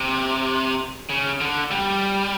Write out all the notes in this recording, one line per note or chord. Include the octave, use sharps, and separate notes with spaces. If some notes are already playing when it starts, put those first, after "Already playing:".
Already playing: C3
C#3
D3
G3